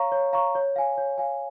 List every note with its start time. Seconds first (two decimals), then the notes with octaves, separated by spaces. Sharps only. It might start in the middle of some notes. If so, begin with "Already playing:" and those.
Already playing: C#5 F5 A#5 C#6
0.12 C#5
0.33 F5 A#5 C#6
0.55 C#5
0.76 F5 G#5
0.98 C#5
1.18 F5 G#5